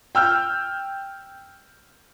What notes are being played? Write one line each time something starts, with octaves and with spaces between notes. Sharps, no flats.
G5 E6 F6 G6